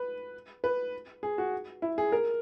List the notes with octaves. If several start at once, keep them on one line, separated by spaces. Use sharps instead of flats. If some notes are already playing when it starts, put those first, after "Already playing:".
Already playing: B4
B4
G#4
F#4
E4
G#4
A#4